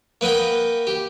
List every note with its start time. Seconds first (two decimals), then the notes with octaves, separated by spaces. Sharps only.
0.21 A#3 B4 D#5 F#5 G5
0.87 G4